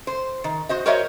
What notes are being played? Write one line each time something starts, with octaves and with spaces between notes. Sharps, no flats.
C5
D#3
F#4 C5 D#5
F#4 A#4 C5 C#5 D#5 E5